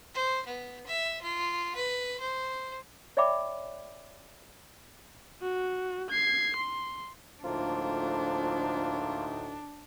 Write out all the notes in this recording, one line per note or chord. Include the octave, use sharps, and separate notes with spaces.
C5
B3
E5
F4
B4
C5
C#5 D5 E5 G5 B5 D6
F#4
G#6 C7
C6
D2 A2 F3 A#3 D4 D#4 F4